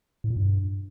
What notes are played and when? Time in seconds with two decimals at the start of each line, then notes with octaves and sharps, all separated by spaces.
0.24 A2
0.30 A#2
0.37 G2